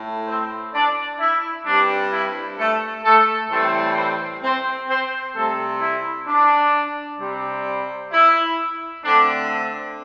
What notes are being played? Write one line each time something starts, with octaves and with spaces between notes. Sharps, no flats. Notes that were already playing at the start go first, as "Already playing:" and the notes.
Already playing: A2 A3
C4 C5
D4 D5
E4
G2 G3 C4 D4
E4
A3 A4
A3 A4
A2 E3 G3 A3 C4 A4
C4 C5
C4 C5
C4 C5
C3 G3 A3 C4 A4
E4
D4
C3 G3 C4
E4
D3 A3 C4 D4